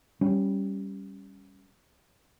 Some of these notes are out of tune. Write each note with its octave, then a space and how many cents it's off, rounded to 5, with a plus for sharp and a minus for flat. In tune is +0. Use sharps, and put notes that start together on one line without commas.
G3 +0 C#4 +0